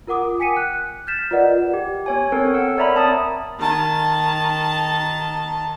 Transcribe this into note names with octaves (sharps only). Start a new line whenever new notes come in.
F4 A#4 F#5 D6 D#6
G5 G#5 B6 C#7 D#7
F#6
F6 G6 A6 B6 E7
F4 A#4 B4 D5 D#5 F#5
G4
B3 C#5 G#5
C4 A4 A#4 C#5
F#5 E6
A#4 C#5 D5 E5 A#5 B5
C4 A5 A#5 D#6 A6
D#3 A5